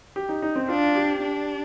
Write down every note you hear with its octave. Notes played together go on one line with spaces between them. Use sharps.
G4
D#4
D#4
C4
D4 F4
G4
D4